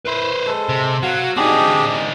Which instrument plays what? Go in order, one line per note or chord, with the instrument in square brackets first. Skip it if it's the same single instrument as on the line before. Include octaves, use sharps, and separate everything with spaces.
[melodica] E4 [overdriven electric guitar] B4 C5
[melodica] G#3 A4
[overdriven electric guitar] C3
[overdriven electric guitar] F#3 [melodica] F5 F#5
[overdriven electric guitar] C4 D#4 [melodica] D4 G4 G#4